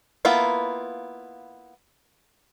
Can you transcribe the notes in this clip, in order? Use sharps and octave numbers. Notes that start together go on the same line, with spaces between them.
A#3 B3 E4 F4